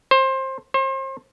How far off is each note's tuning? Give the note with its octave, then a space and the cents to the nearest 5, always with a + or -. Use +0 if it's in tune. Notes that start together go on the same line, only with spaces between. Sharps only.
C5 +20
C5 +35